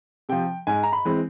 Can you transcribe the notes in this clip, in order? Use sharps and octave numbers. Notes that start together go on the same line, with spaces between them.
C3 F3 G5
G#2 G#5
A#5
B5
E3 G#3 C4